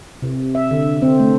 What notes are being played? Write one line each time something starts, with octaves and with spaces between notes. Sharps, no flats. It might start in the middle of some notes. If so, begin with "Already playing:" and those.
C3
E5
D3
C4
A3